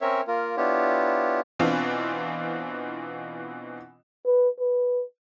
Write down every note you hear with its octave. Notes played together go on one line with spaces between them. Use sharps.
C4 C#4 A#4 C#5 E5
A#3 F4 A#4
B3 D4 E4 F4 G4 C#5
B2 E3 C4 D4 F4
B4
B4